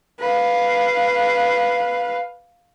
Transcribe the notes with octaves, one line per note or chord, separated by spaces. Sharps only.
B4 F5